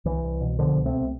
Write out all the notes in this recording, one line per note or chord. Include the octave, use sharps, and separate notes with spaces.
C2 E3
C2
B2
B2 D3 F3
C2
A3 C4
C2